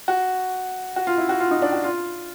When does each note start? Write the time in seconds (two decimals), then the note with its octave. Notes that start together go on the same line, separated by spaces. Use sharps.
0.08 F#4
0.96 F#4
1.07 F4
1.18 E4
1.29 F#4
1.40 F4
1.51 D#4
1.62 D4
1.73 F#4
1.84 F4